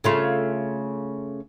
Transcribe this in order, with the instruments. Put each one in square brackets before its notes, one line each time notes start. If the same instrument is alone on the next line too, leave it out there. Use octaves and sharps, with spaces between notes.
[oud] C#3 A3 F4